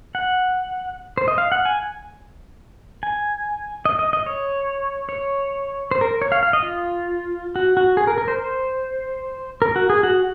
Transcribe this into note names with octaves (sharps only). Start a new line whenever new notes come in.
F#5
C5
D#5
F5
F#5
G#5
G#5
D#5
D#5
D#5
C#5
C#5
C5
A#4
C#5
F5
F5
D#5
F4
F#4
F#4
G#4
A#4
A#4
C5
C5
A#4
F#4
G#4
F#4